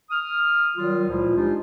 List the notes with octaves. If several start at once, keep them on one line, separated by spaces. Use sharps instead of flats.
D#6 F6
D#3 F#3 G3 F4
C#2 A#2 F3 E4 F4
G#3 D4 D#4 F4 G4